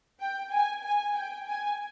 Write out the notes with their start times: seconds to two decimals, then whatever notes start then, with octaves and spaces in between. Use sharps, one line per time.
0.20 G5
0.52 G#5
0.84 G#5
1.15 G5
1.47 G#5